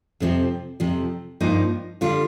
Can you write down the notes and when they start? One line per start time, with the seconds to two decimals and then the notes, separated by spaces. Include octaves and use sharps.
0.20 F2 C3 F3 C4
0.80 F2 C3 F3
1.41 G2 F3 A#3 D#4
2.01 D3 G3 D4 F4